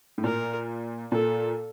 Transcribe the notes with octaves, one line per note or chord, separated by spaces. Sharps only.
A2
A#2 A#4
A#2 A4